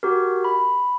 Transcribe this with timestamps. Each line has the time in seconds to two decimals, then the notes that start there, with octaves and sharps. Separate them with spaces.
0.03 F#4 G4 A#4
0.44 B5